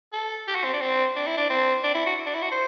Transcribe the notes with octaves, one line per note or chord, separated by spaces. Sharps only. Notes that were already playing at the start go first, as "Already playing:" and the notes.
A4
G4
F#4
C4
D4
C4
D4
E4
D4
C4
D4
E4
F#4
D4
E4
F#4
C5